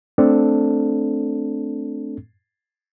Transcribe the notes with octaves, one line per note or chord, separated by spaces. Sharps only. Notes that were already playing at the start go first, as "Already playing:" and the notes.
A3 C4 D4 A4